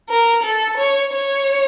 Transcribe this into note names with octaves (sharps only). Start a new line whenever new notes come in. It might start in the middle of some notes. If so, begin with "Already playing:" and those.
A#4
A4
C#5
C#5